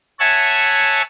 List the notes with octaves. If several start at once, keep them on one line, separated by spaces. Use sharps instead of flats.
C#5 E5 F#5 G#5 A5